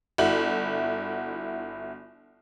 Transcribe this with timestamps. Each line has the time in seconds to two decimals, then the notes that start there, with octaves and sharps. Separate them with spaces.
0.18 G1 E4 F#4 F#7